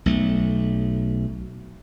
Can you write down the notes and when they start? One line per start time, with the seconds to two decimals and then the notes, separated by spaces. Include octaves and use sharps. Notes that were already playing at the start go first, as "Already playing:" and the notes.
0.06 B1 A3